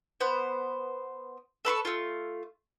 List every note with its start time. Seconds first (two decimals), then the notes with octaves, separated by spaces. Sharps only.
0.20 B3 C5
1.65 A4 B4 C6 C#6
1.85 A3 F4